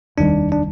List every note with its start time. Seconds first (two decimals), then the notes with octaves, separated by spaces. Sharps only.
0.18 F1 D#2 D#3 G3 D4
0.52 D4